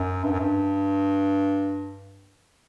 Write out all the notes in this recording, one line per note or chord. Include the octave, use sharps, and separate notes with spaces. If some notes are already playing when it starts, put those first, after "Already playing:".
Already playing: F#2
G2
F#2
G2